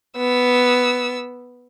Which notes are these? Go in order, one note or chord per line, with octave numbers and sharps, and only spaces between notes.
B3 E6